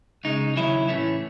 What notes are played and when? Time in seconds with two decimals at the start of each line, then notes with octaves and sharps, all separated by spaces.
0.24 C#2 C#3 G#3 D#4
0.56 D#2 C#3 F#3 C#4 E4
0.88 A2 E3 A3 C#4